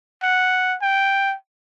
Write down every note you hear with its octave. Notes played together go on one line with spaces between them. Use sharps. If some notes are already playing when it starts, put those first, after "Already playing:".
F#5
G5